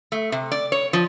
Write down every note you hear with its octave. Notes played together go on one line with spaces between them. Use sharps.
A3
C3
D5
C#5
F3